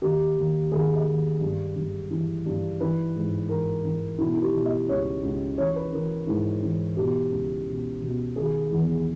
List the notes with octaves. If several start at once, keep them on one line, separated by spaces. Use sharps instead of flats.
D#2 G4
D#2
D#2 G#4
D#5
D#2
G2
G2
E3
G2
E3 B4
G#2
E3 A#4
E3
B2 E4
E4
G4
B2
D#5
C#2 C#5
C#2
E3 C#5
B4
E3 A#4
G#2 E4
E3
B2 G4
C#2
B2
B2
D#3 G#4
E2